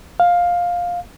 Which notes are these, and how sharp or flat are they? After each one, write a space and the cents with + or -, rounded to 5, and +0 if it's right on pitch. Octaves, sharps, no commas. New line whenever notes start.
F5 +10